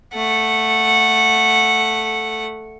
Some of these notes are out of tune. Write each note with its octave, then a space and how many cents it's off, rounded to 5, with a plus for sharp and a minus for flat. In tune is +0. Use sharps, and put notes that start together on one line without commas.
A3 +0 F#5 -10